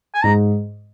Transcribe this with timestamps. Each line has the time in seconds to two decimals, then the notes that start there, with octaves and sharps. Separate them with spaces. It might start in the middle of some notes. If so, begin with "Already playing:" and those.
0.14 G#5
0.24 G#2 A#5